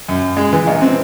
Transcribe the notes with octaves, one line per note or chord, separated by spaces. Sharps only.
F#2
G#3
E3
A#1
C4